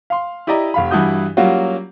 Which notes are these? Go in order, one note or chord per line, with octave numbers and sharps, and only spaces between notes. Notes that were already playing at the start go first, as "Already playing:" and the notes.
F5 C6
E4 G4 D5 D#5 A#5
F1 F5 B5
G2 E3 E4 F#4 D#6 G6
F#3 G3 A#3 C#4 F4 F#4